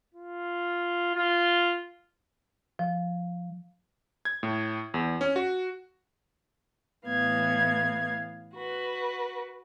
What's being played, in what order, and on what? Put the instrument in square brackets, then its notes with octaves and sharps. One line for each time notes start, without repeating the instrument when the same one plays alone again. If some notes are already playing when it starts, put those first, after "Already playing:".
[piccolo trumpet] F4
F4
[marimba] F3
[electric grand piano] G#6
A2
E2
C#4
F#4
[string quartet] A2 E3 B3 F5 G#6
F#4 B4